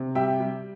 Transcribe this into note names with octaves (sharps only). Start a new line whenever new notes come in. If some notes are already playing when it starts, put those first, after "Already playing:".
Already playing: C3
G3 E5 G5
G3